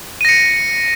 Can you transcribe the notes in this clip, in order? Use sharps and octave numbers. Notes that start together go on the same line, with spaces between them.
A#6 C#7 D#7